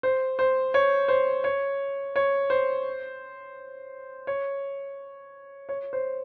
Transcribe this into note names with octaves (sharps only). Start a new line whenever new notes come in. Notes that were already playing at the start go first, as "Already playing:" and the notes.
C5
C5
C#5
C5
C#5
C#5
C5
C#5
C#5
C5